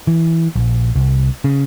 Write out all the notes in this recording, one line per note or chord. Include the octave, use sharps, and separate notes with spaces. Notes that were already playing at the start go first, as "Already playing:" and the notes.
E3
A#1
C2
C#3